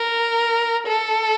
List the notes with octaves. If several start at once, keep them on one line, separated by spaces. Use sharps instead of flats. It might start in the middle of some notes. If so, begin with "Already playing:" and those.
Already playing: A#4
A4